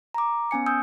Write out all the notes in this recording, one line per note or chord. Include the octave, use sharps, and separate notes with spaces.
A#5 D6
B3 C#4 G#5 C#7
G#5 D#6 E6 G6